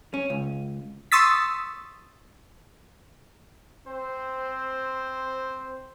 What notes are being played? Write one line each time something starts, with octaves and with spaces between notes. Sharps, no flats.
C#4
C#2
C6 C#6 D#6 E6 A6 B6
C4 C5